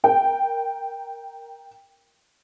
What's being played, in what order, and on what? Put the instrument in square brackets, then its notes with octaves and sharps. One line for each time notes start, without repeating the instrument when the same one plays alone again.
[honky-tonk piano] A#4 G5